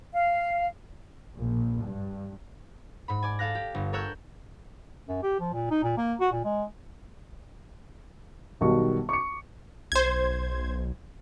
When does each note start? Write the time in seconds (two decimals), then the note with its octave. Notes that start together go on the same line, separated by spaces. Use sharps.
0.13 F5
1.36 A#1
1.84 G2
3.08 G#2 B5
3.23 D5 G#5
3.39 A4 F5 F#6 A#6
3.55 G4
3.74 G1
3.93 A4 A#4 C#5 E6 F#6 G6
5.09 F#2
5.23 G4
5.40 F3
5.53 A#2
5.71 D#4
5.84 A#2
5.98 A#3
6.20 F#4
6.32 A#2
6.45 G#3
8.61 B1 D#3 G3 F#4 C#6
9.09 C#6 D6 C#7
9.92 B1 C5 G#6